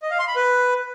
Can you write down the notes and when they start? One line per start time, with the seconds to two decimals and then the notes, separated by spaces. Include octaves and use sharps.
0.02 D#5
0.11 F5
0.19 C6
0.28 B5
0.36 B4